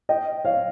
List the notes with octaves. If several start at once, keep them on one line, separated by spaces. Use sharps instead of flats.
D#5 G5
C#5 F5